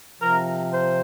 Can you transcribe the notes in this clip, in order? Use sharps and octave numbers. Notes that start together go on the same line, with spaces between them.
C3 F3 A#4
C5